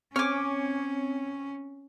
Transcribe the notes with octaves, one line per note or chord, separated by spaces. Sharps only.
C4 C#4 C#5 G#5 D6 F6